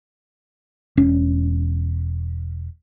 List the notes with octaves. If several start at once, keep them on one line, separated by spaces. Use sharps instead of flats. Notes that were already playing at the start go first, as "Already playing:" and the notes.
E1 C#4